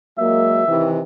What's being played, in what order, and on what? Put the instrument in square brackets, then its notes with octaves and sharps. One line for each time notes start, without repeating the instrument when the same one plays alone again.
[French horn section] F#3 G#3 A#3 [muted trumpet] E5
[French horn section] C3 D#3 E3